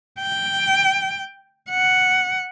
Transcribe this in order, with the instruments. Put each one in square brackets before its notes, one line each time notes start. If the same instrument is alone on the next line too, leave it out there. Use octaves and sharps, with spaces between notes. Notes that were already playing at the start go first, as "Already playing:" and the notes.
[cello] G5
F#5